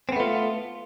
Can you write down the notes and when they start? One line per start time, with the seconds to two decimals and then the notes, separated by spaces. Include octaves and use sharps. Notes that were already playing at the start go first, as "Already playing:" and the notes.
0.09 C4
0.12 B3
0.16 A3
0.20 F4